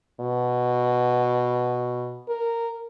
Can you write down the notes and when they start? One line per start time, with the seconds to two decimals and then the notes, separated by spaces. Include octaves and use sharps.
0.20 B2
2.28 A#4